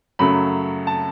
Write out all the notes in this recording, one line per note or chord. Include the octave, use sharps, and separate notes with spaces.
F#2 C#3 F#3 A3 B5
A5